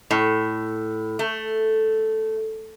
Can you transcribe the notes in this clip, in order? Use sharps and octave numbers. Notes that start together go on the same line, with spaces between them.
A2
A3